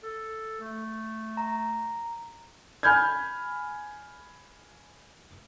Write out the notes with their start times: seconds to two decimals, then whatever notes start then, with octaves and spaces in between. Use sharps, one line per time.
0.03 A4
0.60 A3
1.37 A#5
2.83 G#5 B5 F6 G6 G#6